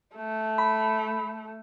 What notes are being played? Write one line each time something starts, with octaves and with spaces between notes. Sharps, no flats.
A3
B5